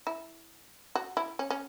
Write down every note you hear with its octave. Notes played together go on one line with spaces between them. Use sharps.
E4
F#4
E4
C#4
C#4